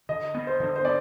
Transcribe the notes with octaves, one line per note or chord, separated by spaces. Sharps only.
D3 D#5
B3
C5
D3
C5
B3 D5